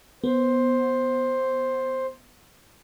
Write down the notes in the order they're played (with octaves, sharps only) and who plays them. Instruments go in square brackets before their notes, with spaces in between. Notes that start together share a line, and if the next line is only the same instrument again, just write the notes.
[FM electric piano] B3 [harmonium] C5